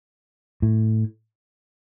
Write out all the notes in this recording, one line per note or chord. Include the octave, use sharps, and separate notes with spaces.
A2